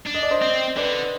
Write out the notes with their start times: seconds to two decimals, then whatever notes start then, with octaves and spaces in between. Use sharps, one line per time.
0.07 D4
0.14 D#5
0.22 D5
0.31 C5 D#5
0.42 C4
0.77 D3 B4 D5